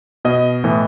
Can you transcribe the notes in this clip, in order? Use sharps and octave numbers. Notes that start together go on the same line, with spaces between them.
B2 D#5
A2 E3